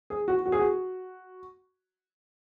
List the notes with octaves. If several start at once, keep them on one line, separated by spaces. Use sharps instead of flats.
G#4
F#4
F#4
G#4
F#4